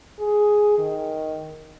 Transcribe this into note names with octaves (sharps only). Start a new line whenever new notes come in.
G#4
D#3